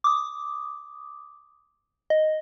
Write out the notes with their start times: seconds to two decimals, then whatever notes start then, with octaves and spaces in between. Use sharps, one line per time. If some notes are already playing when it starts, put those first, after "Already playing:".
0.04 D6 D#6
2.10 D#5